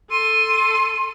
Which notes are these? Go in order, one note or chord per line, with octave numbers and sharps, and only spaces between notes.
A4 C6 D#7